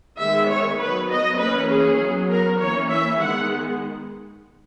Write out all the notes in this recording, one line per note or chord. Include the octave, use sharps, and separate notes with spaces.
D#3 G#3 B3 E5
C#5
F#3 B3 B4
D#5
E3 A#3 C#4 B4
G#4
F#3 B3
A#4
E3 A#3 C#4 C#5
E5
D#3 G#3 B3 F#5